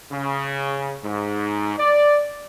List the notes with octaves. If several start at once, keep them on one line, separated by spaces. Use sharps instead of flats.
C#3
G#2
D5